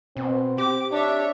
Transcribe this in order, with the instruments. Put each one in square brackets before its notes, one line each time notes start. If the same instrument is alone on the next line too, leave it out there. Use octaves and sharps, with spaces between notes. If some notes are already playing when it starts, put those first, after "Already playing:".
[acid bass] B2 [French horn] C4
[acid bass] G4 [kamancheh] D6
[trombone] D4 [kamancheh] C#5 E5